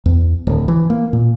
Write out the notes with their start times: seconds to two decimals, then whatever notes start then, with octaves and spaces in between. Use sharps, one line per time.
0.06 E2
0.47 D1
0.68 E3
0.90 A#3
1.13 A#2